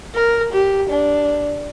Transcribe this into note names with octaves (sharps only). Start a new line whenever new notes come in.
A#4
G4
D4